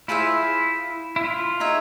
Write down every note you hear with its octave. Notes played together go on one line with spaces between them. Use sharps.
E4 F4 G#4 C5 E5
E4
F4
D#4 G#4 C#5 E5